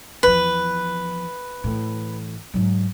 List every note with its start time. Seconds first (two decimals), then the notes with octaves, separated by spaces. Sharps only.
0.23 E2 F3 B4
1.64 A2 E3
2.54 G#2 F#3